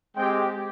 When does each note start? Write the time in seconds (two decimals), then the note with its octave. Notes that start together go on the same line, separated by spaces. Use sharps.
0.16 G#3 C4 G4 G5